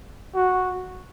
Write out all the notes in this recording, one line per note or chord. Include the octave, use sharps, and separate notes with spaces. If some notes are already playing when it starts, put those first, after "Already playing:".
F#4